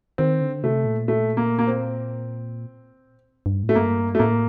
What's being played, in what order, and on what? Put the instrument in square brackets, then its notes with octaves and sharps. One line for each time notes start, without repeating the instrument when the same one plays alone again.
[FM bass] D#3 [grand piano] C4
[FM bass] D3
[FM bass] C3 [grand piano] A3
[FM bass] A#2
[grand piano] A3
A#3
A#3
C4
[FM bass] G2
A2
[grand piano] A3
[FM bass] G2 [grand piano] A#3
[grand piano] A3
[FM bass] A2 [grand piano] A#3